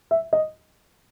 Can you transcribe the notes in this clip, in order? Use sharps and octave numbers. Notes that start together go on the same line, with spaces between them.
E5
D#5